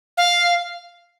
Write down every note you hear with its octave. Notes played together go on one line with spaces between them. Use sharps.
F5